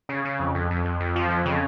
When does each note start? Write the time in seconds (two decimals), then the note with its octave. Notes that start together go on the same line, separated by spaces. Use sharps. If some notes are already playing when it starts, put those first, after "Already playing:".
0.09 C#3
0.25 C#3
0.39 F2
0.55 F2
0.71 F2
0.85 F2
1.00 F2
1.16 F3
1.30 F2
1.45 C#3